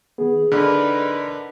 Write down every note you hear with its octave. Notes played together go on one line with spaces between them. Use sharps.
D#3 B3 G#4
D3 D#4 A#4 B4 D5 B5 F6